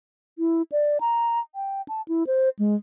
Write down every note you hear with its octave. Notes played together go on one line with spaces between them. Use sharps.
E4
D5
A#5
G5
A5
E4
C5
G#3